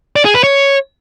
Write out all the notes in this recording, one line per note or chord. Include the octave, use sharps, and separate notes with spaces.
D5
G#4
B4
C#5